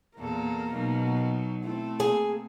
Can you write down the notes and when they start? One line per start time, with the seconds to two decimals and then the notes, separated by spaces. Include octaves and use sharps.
0.17 E2 A#2 A#3 A4 A#4
0.73 B2 F#3 D#4
1.64 A3 C4 E4
2.00 A#3 G#4 G#5